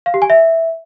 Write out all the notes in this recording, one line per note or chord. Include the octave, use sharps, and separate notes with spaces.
F5
G4
G#5
E5